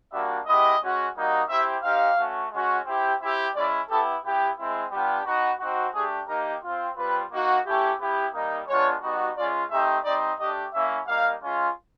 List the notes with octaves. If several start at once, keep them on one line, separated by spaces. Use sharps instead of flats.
G3 A#3 D4 F#4 E5
G#3 B3 E4 G4 D#5
G#3 C#4 F#4
G3 A#3 D#4 F#4
C4 E4 G4 E5
C4 D#4 G4 F5
A3 C#4 F#4
G#3 C#4 F#4
C4 E4 G4
C4 E4 G4 E5
G#3 C#4 E4 D5
B3 E4 G4 A4
B3 E4 G4
G#3 C4 E4
G3 B3 D4 F4 G4
B3 D#4 F#4
C4 D#4 F#4
A3 D4 G4 G#4
A#3 D#4 G4 A#4
C4 F4
G3 C4 F4 B4
A#3 D#4 F#4
A3 C#4 E4 G4
B3 E4 G4
G3 A#3 D#4
G#3 B3 D4 F4 C#5
G3 B3 D#4 F#4
G#3 C#4 F4 D5
A3 C4 D#4 G4 E5
G3 C4 D#4 D5
A3 D4 G4 D#5
A#3 C#4 E4 E5
G3 A#3 D#4 F5
G#3 C#4 F4